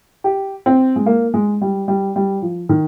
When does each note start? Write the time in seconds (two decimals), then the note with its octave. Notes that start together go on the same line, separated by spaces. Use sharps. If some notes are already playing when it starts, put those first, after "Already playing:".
0.24 G4
0.66 C4
0.96 G#3
1.06 A#3
1.34 G#3
1.61 G3
1.88 G3
2.16 G3
2.42 F3
2.69 D#3